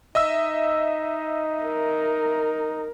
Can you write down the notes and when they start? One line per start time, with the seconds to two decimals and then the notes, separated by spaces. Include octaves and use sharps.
0.15 D#4 D#5 E5 E6
1.63 A#4